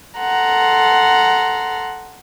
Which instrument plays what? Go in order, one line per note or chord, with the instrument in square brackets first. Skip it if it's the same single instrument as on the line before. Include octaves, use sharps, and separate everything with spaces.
[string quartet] A4 F#5 A#5 C6